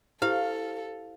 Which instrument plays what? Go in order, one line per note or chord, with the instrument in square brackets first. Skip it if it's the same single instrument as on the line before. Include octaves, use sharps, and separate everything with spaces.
[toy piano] E4 G4 C5 [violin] A4 [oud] F5